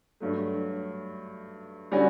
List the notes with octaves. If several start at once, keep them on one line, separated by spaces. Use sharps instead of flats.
G2 F#3 A3
D3 G3 C#4 F#4